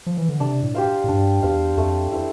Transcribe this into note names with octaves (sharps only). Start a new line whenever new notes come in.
F3
E3
D3
C3 D4
A2
G4 C5 F5
A2
G2 D4
E2 G4 C5 F5
F2 A3
E4 A4 C5